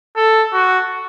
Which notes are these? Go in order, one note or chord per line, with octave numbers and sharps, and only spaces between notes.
A4
F#4